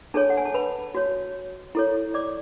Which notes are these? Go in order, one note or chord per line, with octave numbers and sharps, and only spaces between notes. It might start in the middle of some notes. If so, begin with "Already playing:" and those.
D4 G#4 A4 C#5 A5
F#5
G#5
A5
B4 B5
F#4 C#5
E4 A4 C#5
D5 D6